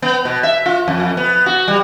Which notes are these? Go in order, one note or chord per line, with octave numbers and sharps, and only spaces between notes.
B3
B2
E5
F4
F2
B3
F#4
G3